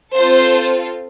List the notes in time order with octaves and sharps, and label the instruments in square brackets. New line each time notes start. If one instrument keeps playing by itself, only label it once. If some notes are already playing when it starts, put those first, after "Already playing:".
[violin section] C4 F4 A4 C5